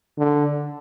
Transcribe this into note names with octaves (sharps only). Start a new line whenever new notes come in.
D3